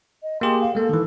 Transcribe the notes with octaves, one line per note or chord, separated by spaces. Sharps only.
D#5
A#3 G4 G#4 C6
F5
G#3 A#3 A4
D#3 E3